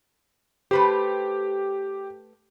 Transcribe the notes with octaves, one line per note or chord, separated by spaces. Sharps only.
A3 G4 B4 C5